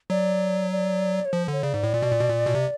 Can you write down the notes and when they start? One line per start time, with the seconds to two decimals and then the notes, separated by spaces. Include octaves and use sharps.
0.10 F#3 D5
0.72 D5
1.25 C#5
1.33 F3 C5
1.48 D3 C#5
1.63 C#3 D5
1.74 G#2
1.83 A2
1.94 A#2
2.02 B2
2.12 A#2
2.20 B2
2.29 A#2
2.46 B2
2.55 C3